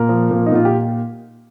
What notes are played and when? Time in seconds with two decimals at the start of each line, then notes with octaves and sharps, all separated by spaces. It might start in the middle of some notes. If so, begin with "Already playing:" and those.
Already playing: A#2 A#4
0.09 F3
0.31 A#2
0.46 D#4
0.52 A#2 F4
0.65 G4